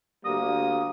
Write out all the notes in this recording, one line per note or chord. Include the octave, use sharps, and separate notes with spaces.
D2 G3 A#3 D#6